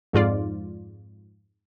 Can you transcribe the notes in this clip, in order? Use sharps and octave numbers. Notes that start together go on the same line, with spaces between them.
F2 G#2 F4 D5